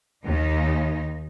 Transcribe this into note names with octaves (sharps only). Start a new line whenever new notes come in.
D#2 D#4